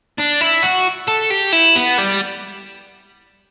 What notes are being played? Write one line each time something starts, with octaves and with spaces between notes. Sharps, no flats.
D4
E4
F#4
A4
G4
E4
B3
G3